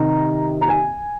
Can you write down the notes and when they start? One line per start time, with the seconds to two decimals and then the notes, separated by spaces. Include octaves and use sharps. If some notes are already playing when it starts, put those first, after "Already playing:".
Already playing: C3 D#3 A#5
0.61 A#5
0.68 G#5